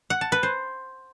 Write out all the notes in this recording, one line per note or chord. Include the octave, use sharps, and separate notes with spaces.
F#5
A5
B4
C5